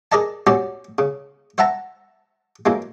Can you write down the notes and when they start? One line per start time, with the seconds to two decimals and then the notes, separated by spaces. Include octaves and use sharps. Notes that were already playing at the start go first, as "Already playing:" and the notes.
0.12 G#4 A#4 D5 D#5 A5
0.47 C#4 F#4 G4 C5 D5
0.98 C#3
1.58 C5 E5 F#5 A5 A#5
2.66 F#2 E3 G#3 A#3